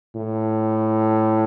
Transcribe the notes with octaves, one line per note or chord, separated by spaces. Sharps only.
A2